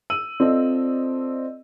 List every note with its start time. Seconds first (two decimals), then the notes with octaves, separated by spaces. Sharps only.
0.10 E6 D#7 F#7
0.40 C4 F4 A4 D5 D#5